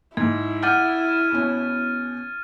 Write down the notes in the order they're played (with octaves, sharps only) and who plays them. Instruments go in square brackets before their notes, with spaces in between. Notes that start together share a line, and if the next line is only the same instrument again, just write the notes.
[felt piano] G#2 [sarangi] E4 [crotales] G#6
[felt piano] F#5 D6 G6 [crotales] F6 A6 D#7
[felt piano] B2 C#4